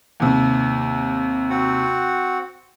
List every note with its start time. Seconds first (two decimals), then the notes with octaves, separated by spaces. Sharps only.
0.20 D#2 C3
1.50 C4 F#4 F#5